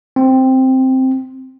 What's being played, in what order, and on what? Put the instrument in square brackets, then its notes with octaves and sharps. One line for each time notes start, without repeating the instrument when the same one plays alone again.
[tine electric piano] C4